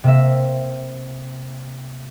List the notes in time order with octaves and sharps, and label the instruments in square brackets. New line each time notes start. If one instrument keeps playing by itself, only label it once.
[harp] C3 A#3 E5